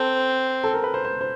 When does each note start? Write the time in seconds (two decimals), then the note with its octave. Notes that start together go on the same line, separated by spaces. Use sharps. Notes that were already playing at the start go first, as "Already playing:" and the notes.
Already playing: C4 A4
0.64 A4
0.74 A#4
0.84 B4
0.94 C5
1.05 C5
1.21 C5